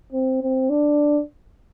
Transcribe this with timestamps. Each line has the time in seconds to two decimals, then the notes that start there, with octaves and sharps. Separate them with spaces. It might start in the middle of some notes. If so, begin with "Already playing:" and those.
0.13 C4
0.42 C4
0.70 D4